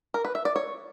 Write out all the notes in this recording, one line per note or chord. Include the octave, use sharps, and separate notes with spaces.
A#4
B4
E5
D5
C#5